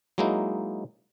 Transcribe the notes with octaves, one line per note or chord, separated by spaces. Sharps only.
F#3 G#3 A#3 D#4 E4